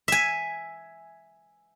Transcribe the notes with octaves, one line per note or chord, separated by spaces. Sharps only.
E5 G#5